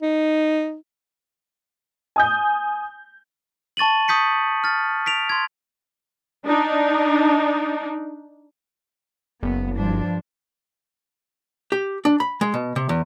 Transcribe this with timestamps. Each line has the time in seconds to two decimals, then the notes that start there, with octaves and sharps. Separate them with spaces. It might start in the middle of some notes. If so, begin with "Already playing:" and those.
0.02 D#4
2.16 G#5 D#6 G6
3.77 A5 C#6 A6 D#7 F#7
4.08 C#6 D#6 G6 B6 C#7
4.64 F6 A6
5.06 B6 D7 F7
5.29 C6 G#6
6.46 D4 D#4
9.43 F#1 B3
9.76 G2 F3 D4
11.72 G4
12.05 D4
12.20 B5
12.41 G#3
12.54 B2
12.76 C3
12.89 E2